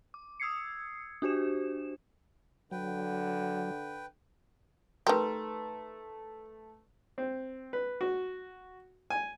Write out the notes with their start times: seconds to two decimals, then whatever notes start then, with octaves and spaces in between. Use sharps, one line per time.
0.14 D6
0.40 D#6 E6 G#6 C7 C#7
1.22 D4 F#4 G4 C5 E7
2.71 D3 F#3 B4 G5
5.07 D#3 A3 G4 B4 A#5 C6
7.18 C4
7.73 B4
8.01 F#4
9.10 G#5